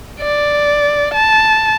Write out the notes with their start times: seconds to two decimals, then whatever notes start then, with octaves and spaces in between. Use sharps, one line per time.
0.21 D5
1.14 A5